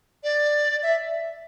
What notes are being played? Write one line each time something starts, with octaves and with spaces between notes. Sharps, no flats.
D5
E5